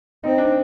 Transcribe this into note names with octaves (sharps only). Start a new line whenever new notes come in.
C4 D#4
D4